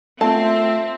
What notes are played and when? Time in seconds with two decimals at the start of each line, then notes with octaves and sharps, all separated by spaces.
0.21 A3 C4 F4 E5 A5